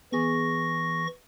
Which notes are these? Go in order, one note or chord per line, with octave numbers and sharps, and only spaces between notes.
E3 B3 G#4 C#6 A#6